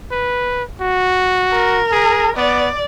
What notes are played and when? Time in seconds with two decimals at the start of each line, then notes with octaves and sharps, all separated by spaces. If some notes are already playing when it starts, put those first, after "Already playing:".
0.11 B4
0.81 F#4
1.52 A#4
1.92 G#4
2.37 B3 D5